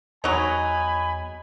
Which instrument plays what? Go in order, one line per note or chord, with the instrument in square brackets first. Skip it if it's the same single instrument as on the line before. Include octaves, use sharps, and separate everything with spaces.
[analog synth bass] E2 [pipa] F#3 D#4 [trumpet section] G#5 B5